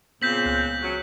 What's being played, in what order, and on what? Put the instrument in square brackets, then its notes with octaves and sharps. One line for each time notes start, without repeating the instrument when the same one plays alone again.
[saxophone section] A#2 C#3 C4 [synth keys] B3 [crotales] G6 B6 F#7
[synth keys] C#2 F#6
[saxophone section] C#3 F#3 C#5